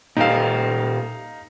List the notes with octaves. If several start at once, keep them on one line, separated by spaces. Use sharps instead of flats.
A#2 D#4 G4 A4 F5